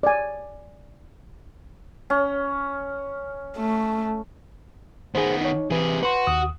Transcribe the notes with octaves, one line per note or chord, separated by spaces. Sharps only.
D5 G#5
C#4
A3
D#3 B3 G#4 C5
D#4 C#5
C3 E3 G#4 B4
F#4 B4 C6
D#2 D#6